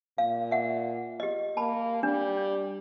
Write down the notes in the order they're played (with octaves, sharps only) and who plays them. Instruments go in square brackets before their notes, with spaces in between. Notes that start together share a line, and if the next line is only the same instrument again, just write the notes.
[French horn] A#2 [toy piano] F5
[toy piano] E5 F#5
G4 D#5
[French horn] A#3 [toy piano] A5 B5
[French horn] G3 [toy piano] D4